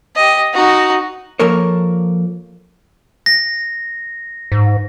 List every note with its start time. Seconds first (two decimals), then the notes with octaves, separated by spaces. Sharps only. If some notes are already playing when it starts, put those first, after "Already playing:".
0.16 G4 D#5
0.54 D#4 F#4
1.39 F3 A#3 A4 A#4 C#5
3.26 A#6
4.52 G#2